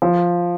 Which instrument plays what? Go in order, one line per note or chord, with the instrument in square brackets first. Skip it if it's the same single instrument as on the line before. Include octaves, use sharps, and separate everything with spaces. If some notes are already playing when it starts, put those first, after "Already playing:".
[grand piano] F3